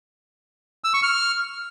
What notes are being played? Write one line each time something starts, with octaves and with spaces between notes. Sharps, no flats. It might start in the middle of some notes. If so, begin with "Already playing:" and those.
E6
C#6
F6